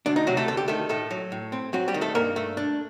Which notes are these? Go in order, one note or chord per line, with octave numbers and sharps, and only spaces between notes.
D2 D4
D#4
C3 F#3 F#4
A3 A4
D2 A4
G4
D#3 A3 A4
A2 A3 A4
F#3
A2
C4
F#3 C4 F#4
G3 G4
D#3
A3 A4
G2 A#3 A#4
A3
D4